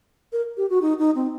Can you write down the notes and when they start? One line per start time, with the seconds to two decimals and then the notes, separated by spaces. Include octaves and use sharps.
0.33 A#4
0.57 G4
0.70 F#4
0.82 D#4
0.99 D#4
1.15 C4